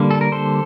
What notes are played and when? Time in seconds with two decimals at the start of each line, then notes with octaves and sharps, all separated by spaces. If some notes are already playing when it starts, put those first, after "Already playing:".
Already playing: D3 G3 A#3
0.11 A4
0.21 A#4
0.32 A4 C5